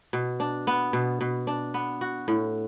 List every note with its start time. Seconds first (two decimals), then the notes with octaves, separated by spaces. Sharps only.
0.13 B2
0.40 D4
0.67 B3
0.93 B2
1.21 B2
1.47 D4
1.74 B3
2.01 F#4
2.28 A2